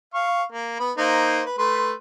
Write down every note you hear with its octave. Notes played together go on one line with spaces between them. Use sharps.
F5 C#6
A#3
B3 B5
A#3 D#4 C5
B4
A3 B4 C6